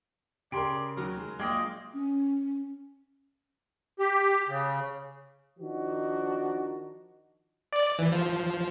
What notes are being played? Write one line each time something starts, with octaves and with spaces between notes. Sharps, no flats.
C#3 G4 A#4 D5 C6 D7
D#2 F#3 A#4
G#3
A#1 G#3 A#3 F4 D5 D#5 G5
C#4
G4
C#3
D#3 F3 D4 D#4 F#4
D5
E3
F3